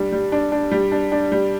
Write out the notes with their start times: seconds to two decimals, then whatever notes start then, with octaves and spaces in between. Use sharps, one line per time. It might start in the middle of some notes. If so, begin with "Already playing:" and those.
Already playing: G3 D4
0.12 G3
0.32 D4
0.52 D4
0.72 G3
0.92 D4
1.12 D4
1.32 G3